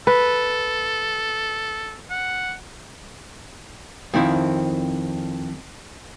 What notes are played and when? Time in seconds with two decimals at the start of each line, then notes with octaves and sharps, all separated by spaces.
0.07 A4 B4
2.10 F#5
4.14 F2 D#3 C4 E4